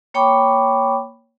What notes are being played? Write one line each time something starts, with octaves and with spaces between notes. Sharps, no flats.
A#3 C#5 G5 B5 C#6 D6